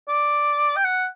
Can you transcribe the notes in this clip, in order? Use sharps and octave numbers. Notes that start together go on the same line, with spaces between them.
D5
G5
F#5